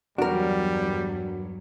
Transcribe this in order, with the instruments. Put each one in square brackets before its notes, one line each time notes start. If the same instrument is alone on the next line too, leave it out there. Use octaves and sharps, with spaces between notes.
[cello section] E2 G2 F#3 [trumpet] G3 [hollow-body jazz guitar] D4 A#4 [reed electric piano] F#4